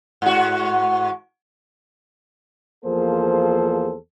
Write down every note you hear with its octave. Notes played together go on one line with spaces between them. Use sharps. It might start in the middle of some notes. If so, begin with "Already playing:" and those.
G#2 F#4
E2 F3 A#3 G#4 A4 C5